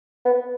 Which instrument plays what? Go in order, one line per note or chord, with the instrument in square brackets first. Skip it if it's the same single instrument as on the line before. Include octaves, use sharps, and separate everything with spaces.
[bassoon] B3